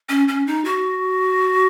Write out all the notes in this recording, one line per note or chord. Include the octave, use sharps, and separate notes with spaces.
C#4
C#4
D#4
F#4